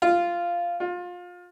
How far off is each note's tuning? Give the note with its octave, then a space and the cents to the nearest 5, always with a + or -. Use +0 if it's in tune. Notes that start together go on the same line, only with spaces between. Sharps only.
F4 -10
F4 +25